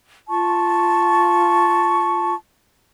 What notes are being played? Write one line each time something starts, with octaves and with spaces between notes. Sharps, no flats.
F4 A5 C#6